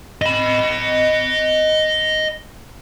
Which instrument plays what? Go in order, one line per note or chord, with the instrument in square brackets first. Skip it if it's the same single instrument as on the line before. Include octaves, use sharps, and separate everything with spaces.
[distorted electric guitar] D#5 B5